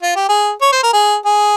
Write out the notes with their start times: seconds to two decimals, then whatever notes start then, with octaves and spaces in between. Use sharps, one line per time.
0.03 F4
0.16 G4
0.29 G#4
0.62 C#5
0.72 C5
0.83 A#4
0.93 G#4
1.26 G#4